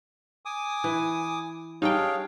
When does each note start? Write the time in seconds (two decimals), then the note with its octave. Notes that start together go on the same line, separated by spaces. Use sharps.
0.45 G#5 D6 D#6
0.84 E3
1.82 G3 D4 D#4 G#4 C#5 F5 G5